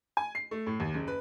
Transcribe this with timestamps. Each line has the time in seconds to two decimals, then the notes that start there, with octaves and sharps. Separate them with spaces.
0.17 G#5
0.35 C7
0.51 A3
0.66 A2
0.80 D#2
0.94 F#1
1.07 B4